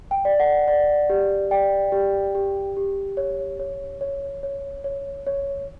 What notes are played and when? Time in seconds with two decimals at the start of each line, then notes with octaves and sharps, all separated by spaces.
0.11 G5
0.25 D5
0.40 F#5
0.68 D5
1.10 G4
1.51 D5 G5
1.92 G4
2.35 G4
2.77 G4
3.17 C#5
3.59 C#5
4.01 C#5
4.43 C#5
4.84 C#5
5.27 C#5